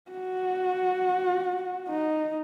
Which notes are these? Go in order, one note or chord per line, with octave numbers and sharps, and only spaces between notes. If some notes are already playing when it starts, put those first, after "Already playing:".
F#4
D#4